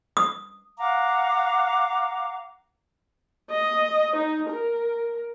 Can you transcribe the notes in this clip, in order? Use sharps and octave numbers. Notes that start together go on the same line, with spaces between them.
D#6
F5 F#5 A#5 D6
D#5
D#4
A#4